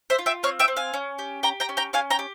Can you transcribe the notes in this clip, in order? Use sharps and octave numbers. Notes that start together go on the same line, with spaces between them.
C5 E5
F4
E5 G5
C4 C#5 F5
E5 G5
C4
F5 G#5
C#4
G4
G4 G5 A#5
G5 A#5
C#4
G5 A#5
C#4 F5 G#5
G5 A#5
G4